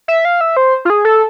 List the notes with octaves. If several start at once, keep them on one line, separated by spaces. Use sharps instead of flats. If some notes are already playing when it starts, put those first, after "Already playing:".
E5
F5
E5
C5
F4
G#4
A4